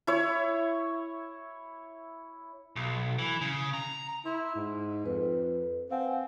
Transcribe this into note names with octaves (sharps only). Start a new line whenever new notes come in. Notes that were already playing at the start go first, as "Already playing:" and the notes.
E4 C#5
B1
E3
C#3
A#5
E4 C6
G#2
F2 B4
C4 F5 F#5 G#5